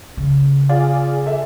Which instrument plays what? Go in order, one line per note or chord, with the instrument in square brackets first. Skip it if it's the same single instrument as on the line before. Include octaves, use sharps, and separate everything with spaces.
[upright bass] C#3
[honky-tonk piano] F4 G#4 D5
A4 E5